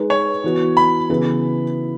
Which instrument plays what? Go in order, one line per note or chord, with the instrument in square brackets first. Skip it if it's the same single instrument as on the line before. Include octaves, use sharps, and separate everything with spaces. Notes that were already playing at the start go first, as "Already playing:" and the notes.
Already playing: [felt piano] G#3 D#4 B4
[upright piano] C#5
[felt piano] E3 B3 F#4
[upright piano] B5
[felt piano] C#3 E3 B3 E4 B4